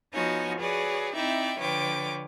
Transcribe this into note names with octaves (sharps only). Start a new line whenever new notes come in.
F3 B3 D#4 F#4 C#5 G#5
F#4 G#4 B4 C#5 D5
C4 D#4 E4 D5 E5 G5
D3 F3 B4 C#5 G5 D6